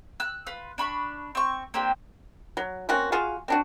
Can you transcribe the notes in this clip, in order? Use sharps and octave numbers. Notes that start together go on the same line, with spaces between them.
E6 F#6
F4 B4
D4 B5 C#6
C4 C#6
A#3 C4 D4 G4
F#3
A#3 C4 C#4 F#4
F4 F#4 G#4 F5
C4 D4 F#4